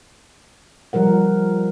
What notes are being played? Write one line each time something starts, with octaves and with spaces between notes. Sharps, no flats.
F3 G3 A#4 F#5